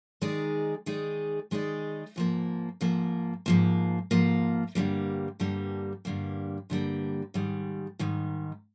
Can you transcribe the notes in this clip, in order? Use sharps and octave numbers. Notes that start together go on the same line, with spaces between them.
D#3 G#3 D#4 G#4 D5
D#3 G#3 D#4 G#4 D5
D#3 G#3 D#4 G#4 D5
G#2 F3 A#3
G#2 F3 A#3
G#2 F3 A#3
G#2 F3 A#3
G2 D3 G3 A#3
G2 D3 G3 A#3
G2 D3 G3 A#3
G2 D3 G3 A#3
G#2 D#3 G3
G#2 D#3 G3